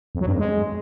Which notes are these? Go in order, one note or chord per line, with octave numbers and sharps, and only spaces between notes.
F2
F#3
G2
F2
G#3